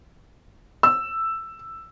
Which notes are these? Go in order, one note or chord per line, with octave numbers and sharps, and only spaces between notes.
E6